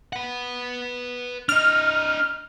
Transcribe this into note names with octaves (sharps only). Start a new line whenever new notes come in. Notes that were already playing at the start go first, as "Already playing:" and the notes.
B4 F#5
D4 D#5 F6